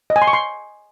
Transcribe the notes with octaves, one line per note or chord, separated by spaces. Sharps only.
D#5
G#5
C6
C#6
C6